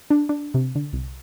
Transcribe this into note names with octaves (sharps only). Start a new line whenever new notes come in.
D4
D4
C3
D3
C2